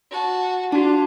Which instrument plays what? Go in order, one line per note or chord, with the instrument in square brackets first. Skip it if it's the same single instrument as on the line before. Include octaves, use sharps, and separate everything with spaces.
[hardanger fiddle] F#4 A5
[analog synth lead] D4 [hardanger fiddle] F4 [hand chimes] F#4 A5